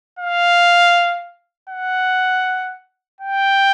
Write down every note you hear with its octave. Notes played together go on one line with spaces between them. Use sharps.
F5
F#5
G5